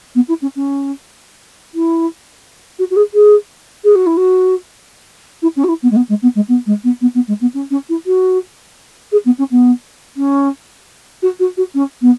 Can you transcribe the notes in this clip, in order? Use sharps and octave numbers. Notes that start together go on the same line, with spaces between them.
B3
E4
C#4
C#4
E4
F#4
F#4
G#4
G#4
G#4
F#4
E4
F#4
E4
C#4
F#4
E4
B3
G#3
B3
G#3
B3
G#3
B3
G#3
B3
B3
B3
G#3
B3
C#4
C#4
E4
F#4
G#4
B3
C#4
B3
C#4
F#4
F#4
F#4
C#4
B3